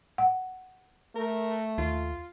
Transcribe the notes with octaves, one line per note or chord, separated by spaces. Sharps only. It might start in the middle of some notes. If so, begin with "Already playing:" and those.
F#5
A3 A#4
D#2 F4